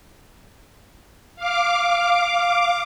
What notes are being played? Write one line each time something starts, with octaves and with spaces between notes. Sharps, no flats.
F5 D6